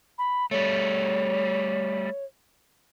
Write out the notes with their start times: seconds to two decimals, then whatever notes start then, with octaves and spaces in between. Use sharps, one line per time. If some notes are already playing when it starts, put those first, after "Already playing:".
0.18 B5
0.51 G3 A3 C#5